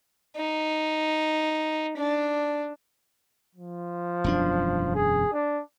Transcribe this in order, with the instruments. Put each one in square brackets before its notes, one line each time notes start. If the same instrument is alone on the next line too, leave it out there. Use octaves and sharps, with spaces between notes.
[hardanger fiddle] D#4
D4
[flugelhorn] F3
[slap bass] E1 F#2 D4
[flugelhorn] G#4
D4